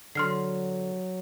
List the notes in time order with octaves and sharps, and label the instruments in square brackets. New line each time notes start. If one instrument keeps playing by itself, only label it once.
[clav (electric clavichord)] D3 [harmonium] F#3 [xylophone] C6 F6 C7